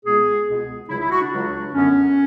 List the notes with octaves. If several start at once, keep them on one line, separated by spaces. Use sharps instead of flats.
C#2 B2 G#3 B3 G#4
C#2 B2 G#3 B3
C#2 C#3 F#3 E4
E4
F#4
D4
C#2 C#3 F#3
F#2 D3 F#3 B3 C#4